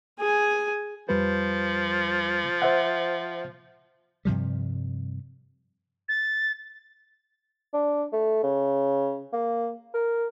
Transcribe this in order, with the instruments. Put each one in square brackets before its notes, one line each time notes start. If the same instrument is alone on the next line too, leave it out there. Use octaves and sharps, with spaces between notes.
[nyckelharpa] G#4 G#5
[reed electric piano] F2 G3 B4 [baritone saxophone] F3
[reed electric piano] C5 E5 F#5
[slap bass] G2 C3 F3 G3
[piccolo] A6
[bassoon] D4
A3
C#3
A#3
A#4